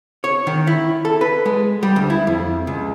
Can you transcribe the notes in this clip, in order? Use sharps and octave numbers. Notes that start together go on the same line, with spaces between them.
C#5
D#3
E4
A4
B4
G#3
G3
D2
E4
F2
C#2